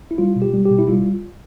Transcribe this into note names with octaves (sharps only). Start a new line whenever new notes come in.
E4
G3 F4
B2
G4
G3
G4
B2
E4
G3 F4